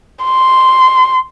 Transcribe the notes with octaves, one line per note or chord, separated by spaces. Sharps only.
C6